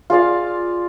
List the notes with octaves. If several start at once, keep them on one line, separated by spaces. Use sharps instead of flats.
F4 G#4 D5 F5